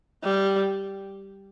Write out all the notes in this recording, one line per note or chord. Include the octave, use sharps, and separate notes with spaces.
G3